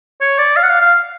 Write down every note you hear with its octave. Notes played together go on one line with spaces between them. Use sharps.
C#5
D5
F5
F#5
F5
F5